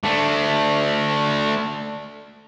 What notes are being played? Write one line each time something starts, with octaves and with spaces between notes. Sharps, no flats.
A3 D4